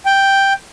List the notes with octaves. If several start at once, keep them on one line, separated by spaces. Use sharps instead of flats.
G5